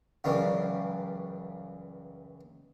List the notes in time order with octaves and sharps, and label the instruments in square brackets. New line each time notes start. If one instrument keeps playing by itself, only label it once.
[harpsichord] C#2 F#2 C#3 E3 G3